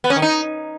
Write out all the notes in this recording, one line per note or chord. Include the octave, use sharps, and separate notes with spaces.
B3
C#4
D#3
D#4